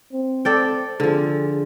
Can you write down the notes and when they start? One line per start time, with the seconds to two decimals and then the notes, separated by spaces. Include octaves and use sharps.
0.13 C4
0.45 A4 D5 G5
1.00 D3 F3 G#4